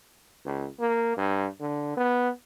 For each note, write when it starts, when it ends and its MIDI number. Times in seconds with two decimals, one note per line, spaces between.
0.45 0.68 37
0.79 1.15 58
1.17 1.47 43
1.60 1.92 50
1.97 2.29 59